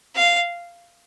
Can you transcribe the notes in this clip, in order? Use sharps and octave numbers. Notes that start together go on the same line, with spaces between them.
F5